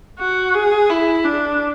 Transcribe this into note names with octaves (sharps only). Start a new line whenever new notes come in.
F#4
G#4
E4
D4